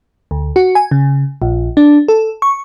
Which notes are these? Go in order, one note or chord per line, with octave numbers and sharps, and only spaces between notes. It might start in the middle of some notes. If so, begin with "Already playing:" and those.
D2
F#4
G#5
C#3
A#1
D4
A4
C#6